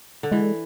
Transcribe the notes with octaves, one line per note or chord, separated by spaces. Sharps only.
D3
E3 G#3